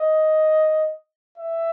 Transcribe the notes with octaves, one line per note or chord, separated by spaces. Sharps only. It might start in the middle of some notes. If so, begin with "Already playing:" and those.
Already playing: D#5
E5